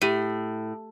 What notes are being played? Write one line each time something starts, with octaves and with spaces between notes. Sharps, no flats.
A2 G4 D#7